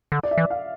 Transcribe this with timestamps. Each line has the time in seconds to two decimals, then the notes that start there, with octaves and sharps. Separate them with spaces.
0.12 D3
0.23 D5
0.31 E5
0.38 E3
0.50 F5